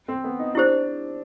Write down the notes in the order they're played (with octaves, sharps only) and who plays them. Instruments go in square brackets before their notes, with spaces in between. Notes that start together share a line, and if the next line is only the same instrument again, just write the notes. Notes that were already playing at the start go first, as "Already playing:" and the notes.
[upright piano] C4
B3
D#4
[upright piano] D4 [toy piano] E4 G4 C5